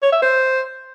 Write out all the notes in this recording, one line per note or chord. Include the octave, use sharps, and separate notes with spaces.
C#5
E5
C5